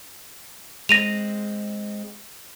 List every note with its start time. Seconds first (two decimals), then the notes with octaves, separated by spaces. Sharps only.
0.89 G#3 C4 A#6 D#7 F7